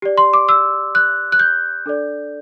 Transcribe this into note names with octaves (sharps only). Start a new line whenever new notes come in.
G4 D5
C6
D6
E6
F#6
F#6
G6
D4 A4 D5